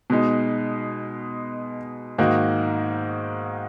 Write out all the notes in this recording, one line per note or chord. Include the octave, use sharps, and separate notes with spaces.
B2 G#3 D#4
G#2 D#3 A#3 D#4 F#4